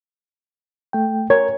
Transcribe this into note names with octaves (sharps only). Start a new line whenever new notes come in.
A3 G5
A#4 C#5 G#6